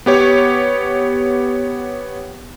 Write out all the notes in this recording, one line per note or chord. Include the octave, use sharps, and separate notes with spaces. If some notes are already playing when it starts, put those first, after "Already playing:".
B3 G4 C#5